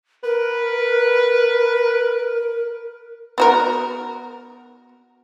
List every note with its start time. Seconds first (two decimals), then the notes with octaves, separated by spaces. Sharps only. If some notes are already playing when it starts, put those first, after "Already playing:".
0.24 A#4 B4
3.38 B3 F#4 A#4